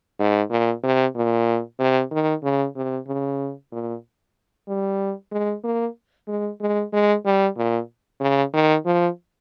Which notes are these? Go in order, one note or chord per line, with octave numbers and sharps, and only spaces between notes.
G#2
A#2
C3
A#2
C3
D#3
C#3
C3
C#3
A#2
G3
G#3
A#3
G#3
G#3
G#3
G3
A#2
C#3
D#3
F3